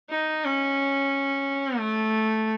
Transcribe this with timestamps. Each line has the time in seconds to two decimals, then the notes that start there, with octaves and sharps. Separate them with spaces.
0.11 D#4
0.45 C#4
1.79 A3